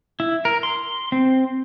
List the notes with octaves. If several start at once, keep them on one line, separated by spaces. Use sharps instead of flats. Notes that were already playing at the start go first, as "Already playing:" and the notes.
E4
A#4
C6
C4